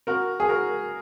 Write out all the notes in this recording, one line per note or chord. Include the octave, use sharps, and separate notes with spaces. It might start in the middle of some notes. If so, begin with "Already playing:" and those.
F#4 A#4
G#4
F#4 A#4